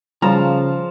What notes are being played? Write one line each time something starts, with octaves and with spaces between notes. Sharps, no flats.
C#3 F3 G3 A5 A#5